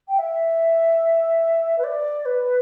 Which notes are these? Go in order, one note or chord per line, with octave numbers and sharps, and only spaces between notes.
G5
E5
B4
D5
B4